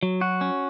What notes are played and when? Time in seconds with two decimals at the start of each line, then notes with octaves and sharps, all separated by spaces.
0.03 F#3
0.21 F#4
0.41 C#4